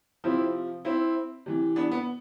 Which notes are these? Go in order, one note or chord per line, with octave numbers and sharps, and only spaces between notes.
C3 F3 C4 E4
C4 E4
C3 E3
B3 D4
B3